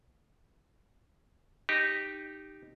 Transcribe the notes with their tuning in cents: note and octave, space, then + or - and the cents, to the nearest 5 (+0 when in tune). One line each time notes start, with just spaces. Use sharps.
D#4 -10 G4 +0